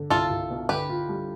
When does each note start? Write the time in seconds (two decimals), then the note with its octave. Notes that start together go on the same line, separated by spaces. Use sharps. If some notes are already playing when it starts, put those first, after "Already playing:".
Already playing: D3
0.10 C2 F4 A4
0.30 C2
0.50 B2
0.69 D3 G4 B4
0.89 F4
1.09 G3